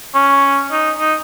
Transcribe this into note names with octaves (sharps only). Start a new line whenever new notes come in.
C#4
D#4
D#4